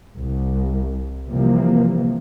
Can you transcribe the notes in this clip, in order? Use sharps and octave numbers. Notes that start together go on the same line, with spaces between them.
C2
C3 E3 F3 G3 A#3